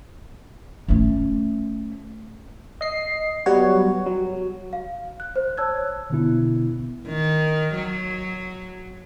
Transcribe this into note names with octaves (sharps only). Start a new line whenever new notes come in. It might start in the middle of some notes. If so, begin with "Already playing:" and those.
A3 C#4
D#5 C7
F#3 G3 B3 F#4 C#5
F#3
F5
F#6
C5
C#5 A5 E6 F#6 G#6
B2 D3 B3 E4
D#3
F#3